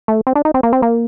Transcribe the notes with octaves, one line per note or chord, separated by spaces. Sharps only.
A3
C4
D4
D#4
C4
A#3
C4
A#3